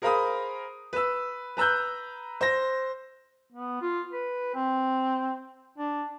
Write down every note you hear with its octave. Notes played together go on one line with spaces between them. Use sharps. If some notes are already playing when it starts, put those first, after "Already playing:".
G#4 A#4 C5 F5 B5 D#6
B4 E6
B4 A#5 E6 F#6 G6
C5 A#6
B3
F4
B4
C4
D4